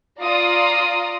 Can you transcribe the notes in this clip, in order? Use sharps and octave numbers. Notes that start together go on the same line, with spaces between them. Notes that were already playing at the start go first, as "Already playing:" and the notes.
F4 D5 F5 A#5 C6 D#6